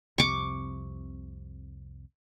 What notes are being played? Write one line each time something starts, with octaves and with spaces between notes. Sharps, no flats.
C2 F2 C3 C#6 D6